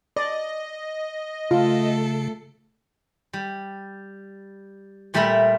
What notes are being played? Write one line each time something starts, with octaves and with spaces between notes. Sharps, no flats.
D5 D#5
C#3 A3 F4 A4
G3
A#2 G3 A3 A#4 E5 B5